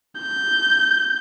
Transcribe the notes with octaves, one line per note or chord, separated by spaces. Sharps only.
G6